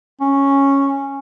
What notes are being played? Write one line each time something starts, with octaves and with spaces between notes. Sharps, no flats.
C#4